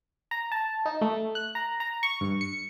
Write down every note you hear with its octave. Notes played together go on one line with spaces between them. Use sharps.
A#5
A5
D#4
A3
F#6
A#5
A#5
C#6
G2
C#7